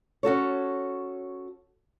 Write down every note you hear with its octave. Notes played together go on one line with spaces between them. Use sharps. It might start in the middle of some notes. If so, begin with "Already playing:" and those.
C#4 F#4 A4 C#5